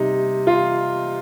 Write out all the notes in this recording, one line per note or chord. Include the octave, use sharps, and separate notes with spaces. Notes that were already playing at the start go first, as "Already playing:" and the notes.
Already playing: C3 G3 D#4
F4